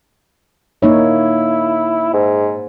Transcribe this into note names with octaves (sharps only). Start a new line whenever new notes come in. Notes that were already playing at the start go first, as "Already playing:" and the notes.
A#3 D#4 E4 C#5
G#2